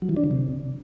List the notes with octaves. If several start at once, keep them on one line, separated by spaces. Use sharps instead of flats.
F#3
E3
D4
D3
C3